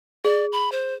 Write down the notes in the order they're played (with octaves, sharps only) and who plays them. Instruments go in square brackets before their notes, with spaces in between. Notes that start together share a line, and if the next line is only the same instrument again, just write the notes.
[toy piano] G#4 [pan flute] D5
[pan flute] B5
C5